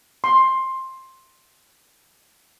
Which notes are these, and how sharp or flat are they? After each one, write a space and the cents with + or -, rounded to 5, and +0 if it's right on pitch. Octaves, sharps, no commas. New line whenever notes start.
C6 +10